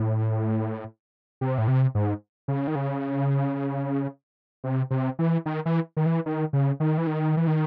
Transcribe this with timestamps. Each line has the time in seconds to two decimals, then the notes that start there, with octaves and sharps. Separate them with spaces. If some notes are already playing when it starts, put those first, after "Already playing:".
Already playing: A2
1.41 C3
1.58 A2
1.68 C3
1.95 G#2
2.48 C#3
2.67 D#3
2.75 C#3
4.64 C3
4.91 C3
5.19 E3
5.46 D#3
5.66 E3
5.97 D#3
6.06 E3
6.26 D#3
6.53 C#3
6.80 D#3
6.98 E3
7.07 D#3
7.37 E3
7.47 D#3